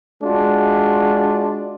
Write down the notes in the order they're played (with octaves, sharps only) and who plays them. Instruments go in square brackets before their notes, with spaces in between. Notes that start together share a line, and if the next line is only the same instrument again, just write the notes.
[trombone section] G#3 F4 F#4 [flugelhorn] D4